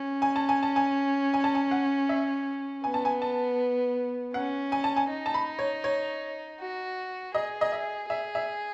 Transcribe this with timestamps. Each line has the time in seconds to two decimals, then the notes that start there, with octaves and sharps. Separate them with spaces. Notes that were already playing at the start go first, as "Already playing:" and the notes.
Already playing: C#4
0.22 G#5
0.36 A5
0.49 G#5
0.63 A5
0.76 G#5
1.34 G#5
1.44 A5
1.55 G#5
1.71 F#5
2.09 E5
2.84 B3 G#5
2.94 A5
3.05 G#5
3.22 A5
4.34 C#4 F#5
4.72 G#5
4.84 A5
4.96 G#5
5.09 D#4
5.26 A5
5.34 B5
5.59 C#5
5.84 C#5
6.60 F#4
7.34 G#4 D#5
7.61 D#5
7.72 E5
8.09 G#4 E5
8.35 E5